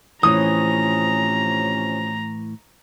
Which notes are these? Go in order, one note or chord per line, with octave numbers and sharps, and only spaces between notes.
A2 C3 E3 F3 C#4 A#5 D#6